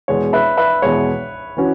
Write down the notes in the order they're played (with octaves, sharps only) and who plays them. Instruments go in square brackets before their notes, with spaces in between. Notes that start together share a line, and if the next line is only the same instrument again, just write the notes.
[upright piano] E2 B2 G#3 [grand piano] C#5
[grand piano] B4 E5
B4 E5
[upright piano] E2 B2 G#3 [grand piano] C#5
[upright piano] E3 C#4 F#4